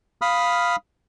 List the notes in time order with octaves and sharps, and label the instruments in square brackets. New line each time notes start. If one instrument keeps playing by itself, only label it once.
[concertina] F5 B5 D#6 F6